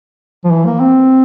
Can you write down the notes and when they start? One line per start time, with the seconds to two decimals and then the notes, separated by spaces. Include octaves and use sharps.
0.44 F3
0.52 E3
0.66 A#3
0.80 C4